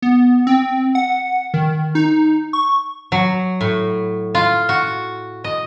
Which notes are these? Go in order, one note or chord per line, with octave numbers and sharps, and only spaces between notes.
B3
C4
F#5
D#3
D#4
C#6
F#3
A2
F4
F#4
D#5